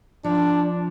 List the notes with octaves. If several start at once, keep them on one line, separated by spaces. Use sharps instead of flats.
F3 D4